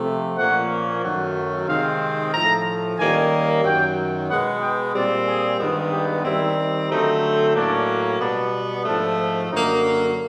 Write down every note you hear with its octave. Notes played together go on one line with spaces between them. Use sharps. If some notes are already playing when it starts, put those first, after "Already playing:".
Already playing: C3 F3 A3
A#2 F3 A#3 C#4 F#5
F#2 D#3 F#3 A3 F#5
C3 D#3 G#3 C4 F5
A2 F3 A3 A#5
D#3 G3 A#3 C#4 G#5
F#2 D#3 F#3 G5
B2 G#3 B3 F#5
G5
A#2 G3 C4 D5
G#4
G2 D#3 G#3 B3
G4
D#3 G3 C4 E4
D3 F#3 A3 C4 D#4
A2 F#3 A#3 C#4 D4
B2 G3 B3 D4
G#2 F3 A3 D4
F#2 D3 F#3 A#3 D#4